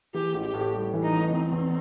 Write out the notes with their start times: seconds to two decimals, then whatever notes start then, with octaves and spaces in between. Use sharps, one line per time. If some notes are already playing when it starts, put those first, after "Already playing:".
0.14 E3 G4
0.35 A1
0.45 G4
0.54 A2
0.74 G3
0.93 E3
1.03 D#4
1.13 A1
1.32 E3 C4
1.52 E2